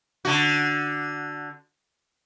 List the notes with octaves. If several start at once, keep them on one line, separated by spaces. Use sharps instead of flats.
D3 F#4